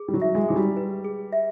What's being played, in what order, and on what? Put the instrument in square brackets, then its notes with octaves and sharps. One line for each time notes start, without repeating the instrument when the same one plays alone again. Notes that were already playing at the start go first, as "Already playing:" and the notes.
Already playing: [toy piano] G#4
[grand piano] G3
F#3
[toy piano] E5
[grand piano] G#3
[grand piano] F#3 [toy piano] G#4
[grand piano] G3
[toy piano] B4
G#4
E5